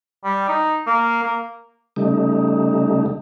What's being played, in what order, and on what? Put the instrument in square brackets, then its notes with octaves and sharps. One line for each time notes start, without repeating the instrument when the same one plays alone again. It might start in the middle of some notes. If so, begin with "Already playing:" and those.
[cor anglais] G3
D#4
A#3
A#3
[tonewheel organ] C#3 G3 A3 D#4